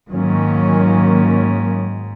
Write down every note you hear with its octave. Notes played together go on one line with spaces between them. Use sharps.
G#2 D#3 F#3 A#3 C#4